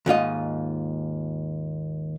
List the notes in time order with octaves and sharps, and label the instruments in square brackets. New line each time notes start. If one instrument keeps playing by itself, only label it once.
[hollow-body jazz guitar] D#2 G#2 F4 D#5